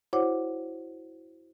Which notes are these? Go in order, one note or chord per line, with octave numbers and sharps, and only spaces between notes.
E4 F#4 C5 C#5 F#5 D6